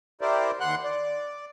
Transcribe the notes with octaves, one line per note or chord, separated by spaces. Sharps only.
E4 G4 A#4 C5 D5
D#2 F#5 C6 F#6
D5